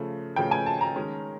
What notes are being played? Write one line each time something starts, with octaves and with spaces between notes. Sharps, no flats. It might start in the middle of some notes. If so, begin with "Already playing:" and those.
Already playing: C#3 F3 A3
C#3 F3 A3 G5
G#5
A5
A#5
D#3 G#3 C#4